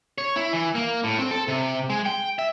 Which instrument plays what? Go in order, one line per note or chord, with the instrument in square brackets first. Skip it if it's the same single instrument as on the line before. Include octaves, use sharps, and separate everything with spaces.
[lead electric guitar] C#5
E4
E3
A#3
A2
C4
A4
C3
G#3
G5
E5